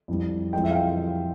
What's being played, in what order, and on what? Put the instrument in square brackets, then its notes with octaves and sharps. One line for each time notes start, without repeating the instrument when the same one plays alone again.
[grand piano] F2 E3 G3
[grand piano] F2 E3 G#3 [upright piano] G5
[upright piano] E5
F5
G5